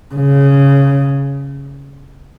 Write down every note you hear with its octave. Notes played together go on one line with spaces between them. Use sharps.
C#3